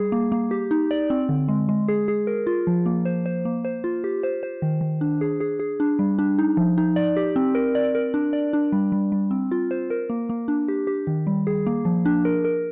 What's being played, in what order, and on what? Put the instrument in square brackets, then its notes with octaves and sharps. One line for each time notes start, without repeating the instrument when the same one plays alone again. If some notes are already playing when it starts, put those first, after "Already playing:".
Already playing: [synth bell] G3 G#4
A#3
A#3
G4
D#4
D5
C4
D3
G#3
G#3
G#4
G#4
A#4
F4
F3
A#3
C5
C5
A#3
C5
F4
G4
C5
C5
D#3
D#3
D4
G#4
G#4
G#4
D4
G3
D4
D#4
F3
D#4
D5
G4
C4
A#4
D5
A#4
D4
D5
D4
G3
G3
G3
C4
F4
C5
A#4
A#3
A#3
D4
G4
G4
D#3
G3
G#4
A#3
F3
D4
A#4
A#4